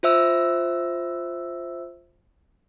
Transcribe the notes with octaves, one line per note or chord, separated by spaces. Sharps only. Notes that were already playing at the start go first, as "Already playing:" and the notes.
F4 C5 E5 E6